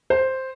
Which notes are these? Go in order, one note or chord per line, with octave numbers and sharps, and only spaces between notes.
C5